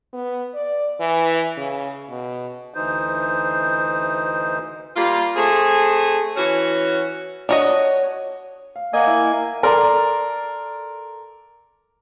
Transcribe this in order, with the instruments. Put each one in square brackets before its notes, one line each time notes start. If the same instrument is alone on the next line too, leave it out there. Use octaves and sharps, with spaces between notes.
[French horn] B3
D5
E3
C#3
B2
[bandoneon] D2 E3 D#4 C5
[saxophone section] G3 A#3 F4
A3 C4 G#4
E3 C#4 F#4
[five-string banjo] D4 F#4 D#5 [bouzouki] C#5
[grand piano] F5
[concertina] A#3 G#5 [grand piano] D#5 F5 F#5
[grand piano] E4
[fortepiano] A4 A#4 D5 C6